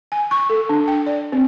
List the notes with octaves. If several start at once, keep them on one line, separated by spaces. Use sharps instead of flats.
G#5
C#6
A4
D4
G5
D5
C4